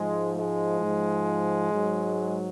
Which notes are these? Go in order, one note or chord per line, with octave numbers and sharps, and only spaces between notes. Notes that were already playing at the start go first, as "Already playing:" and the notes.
Already playing: G#2 F3 G#3
G#3
G#2 F3
G#2 F#3